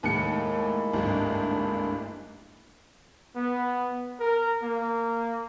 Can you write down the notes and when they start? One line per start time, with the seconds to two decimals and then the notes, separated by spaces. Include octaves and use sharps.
0.03 D#2 A2 G#3 A#3 E4 C#7
0.93 G#1 D2 G2
3.36 B3
4.20 A#4
4.63 A#3